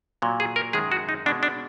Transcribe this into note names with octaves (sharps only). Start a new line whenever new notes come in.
A#2 F#3
G#4
A#4
F#2 D#3 G#3 G#4
F#4
D#4
B2 G#3 D4
D4